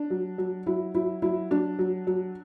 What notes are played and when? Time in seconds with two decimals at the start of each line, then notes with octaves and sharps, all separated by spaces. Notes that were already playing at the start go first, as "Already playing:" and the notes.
Already playing: D4
0.10 F#3
0.38 F#3
0.66 F#3 E4
0.94 F#3 E4
1.22 F#3 E4
1.51 F#3 D4
1.79 F#3
2.07 F#3